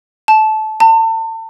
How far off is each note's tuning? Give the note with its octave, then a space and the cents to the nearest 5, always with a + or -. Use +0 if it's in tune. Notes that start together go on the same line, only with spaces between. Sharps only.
A5 -20
A5 +35